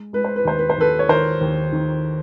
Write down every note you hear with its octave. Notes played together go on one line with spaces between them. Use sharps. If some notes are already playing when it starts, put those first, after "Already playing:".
Already playing: G#3
G#3 B4
C5
B4
D#2 C5
B4
C5
D#2 A4 B4
C#5
D#3 A#4 C5
D#2
D#3